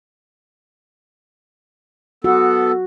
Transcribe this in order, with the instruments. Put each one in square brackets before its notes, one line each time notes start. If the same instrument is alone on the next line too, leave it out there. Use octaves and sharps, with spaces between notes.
[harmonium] B3 A4 [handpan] F#4